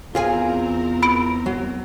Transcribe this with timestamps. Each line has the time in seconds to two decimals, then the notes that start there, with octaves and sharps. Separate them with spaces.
0.15 E2 C4 F4 G#4 A#4 G#5
1.03 B5 D7
1.46 F#3